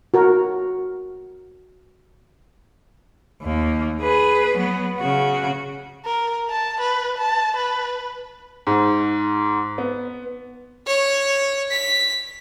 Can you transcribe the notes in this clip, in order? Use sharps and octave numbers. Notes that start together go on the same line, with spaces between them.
F#4 A#4
D#2 A#3
G#4 B4
F#3 B3
C#3 F#4
A#4
A5
B4
A5
B4
G#2
B3
C#5
B6